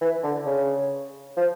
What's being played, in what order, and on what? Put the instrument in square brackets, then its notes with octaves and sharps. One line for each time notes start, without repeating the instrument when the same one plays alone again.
[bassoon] E3
D3
C#3
F3